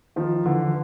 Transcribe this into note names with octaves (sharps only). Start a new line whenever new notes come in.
D#3 F3
D3 E3